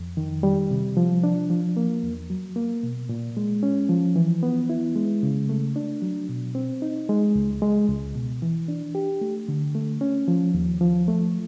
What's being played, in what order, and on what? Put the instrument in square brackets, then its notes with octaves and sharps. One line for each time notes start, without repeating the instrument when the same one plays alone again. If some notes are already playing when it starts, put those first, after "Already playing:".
Already playing: [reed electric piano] F2
D#3
G3
C3
F3
D4
F3
A#3
E2
F#3
A#3
B2
A#2
G#3
C#4
F3
E3
B3
E4
G#3
C#3
A3
D4
F#3
B2
C4
D#4
G#3
C#2
G#3
C#2
B2
E3
D4
G4
A3
D3
A3
C#4
F3
D#2
F3
A3